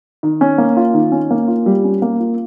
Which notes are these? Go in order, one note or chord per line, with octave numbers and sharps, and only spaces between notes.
D#3
C#4
A#3
F4
D#3
C#4
A#3
F4
G3
C#4
A#3
F4